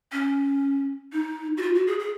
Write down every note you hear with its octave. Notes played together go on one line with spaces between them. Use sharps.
C#4
D#4
F#4
F4
F#4
G#4
G#4